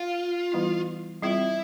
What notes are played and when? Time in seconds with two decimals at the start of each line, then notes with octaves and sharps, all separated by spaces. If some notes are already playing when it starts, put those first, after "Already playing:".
Already playing: F4
0.52 E3 G3 B3 E4
1.22 G3 C4 E4 F4